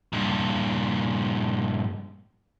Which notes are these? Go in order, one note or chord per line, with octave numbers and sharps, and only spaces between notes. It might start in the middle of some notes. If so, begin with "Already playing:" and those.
G2 A#2